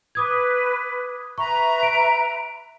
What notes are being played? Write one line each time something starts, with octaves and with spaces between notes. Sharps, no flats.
B4 D6 D#6 G#6
B4 E5 A#5 C#6
D7